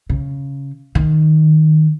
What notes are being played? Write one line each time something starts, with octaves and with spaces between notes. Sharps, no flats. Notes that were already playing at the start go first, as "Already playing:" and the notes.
C#3
D#3